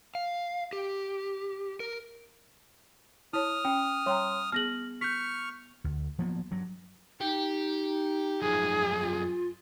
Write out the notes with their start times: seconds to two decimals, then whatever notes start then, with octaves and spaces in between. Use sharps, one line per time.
0.15 F5
0.73 G4
1.80 A#4
3.33 E4 C#5 A5 D#6 F6
3.65 C#4 G5
4.06 G3 C#5 G5 A#5 C6
4.52 B3 G#4 F6 A#6 F#7
5.01 C#6 F6 G6 B6
5.84 D2
6.19 F3 F#3 A#3 B3
6.51 G2 F#3
7.21 D#4 G4
8.42 F#2 F3 G#4
9.01 F4